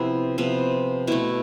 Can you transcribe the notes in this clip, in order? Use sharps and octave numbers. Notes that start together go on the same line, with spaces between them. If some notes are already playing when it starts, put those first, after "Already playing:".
Already playing: C3 F3 B3 E4
C3 F3 B3
B2 A3 E4